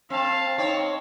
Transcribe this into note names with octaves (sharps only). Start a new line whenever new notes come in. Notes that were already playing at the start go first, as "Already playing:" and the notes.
C4 F5 A5
C4 D#4 C#5